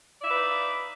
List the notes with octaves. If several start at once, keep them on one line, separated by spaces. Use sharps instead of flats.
D#4 F4 B4 D5 E5